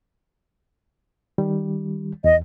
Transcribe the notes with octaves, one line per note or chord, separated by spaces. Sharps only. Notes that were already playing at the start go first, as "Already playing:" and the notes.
D#3 G3
E2 D#5